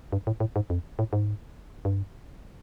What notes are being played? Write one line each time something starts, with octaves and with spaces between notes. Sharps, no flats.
G2
A2
A2
G#2
F2
A2
G#2
G2